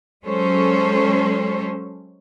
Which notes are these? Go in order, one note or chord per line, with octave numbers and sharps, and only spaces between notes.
F#3 G#3 C#4 A4 C5 C#5